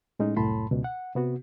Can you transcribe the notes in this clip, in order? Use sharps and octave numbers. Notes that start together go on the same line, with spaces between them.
A2 G#3 C#4 D#4
C2 F#2 A2 A5 B5 C6
C#2 B2
F#5
C3 B3 F#4